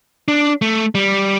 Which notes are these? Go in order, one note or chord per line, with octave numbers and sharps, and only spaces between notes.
D4
A3
G3